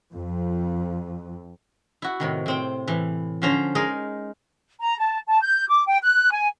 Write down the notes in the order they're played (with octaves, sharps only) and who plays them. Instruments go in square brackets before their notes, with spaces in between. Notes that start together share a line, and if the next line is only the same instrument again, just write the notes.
[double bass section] F2
[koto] E4 F#4
A2 C3 D#3
A2 C4 G5
A2 E3
D3 F3 C#4 C5 A#5
G#3 D#4 G#4 A#4
[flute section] A#5
A5
A5
G6
D6
G5
F#6
G#5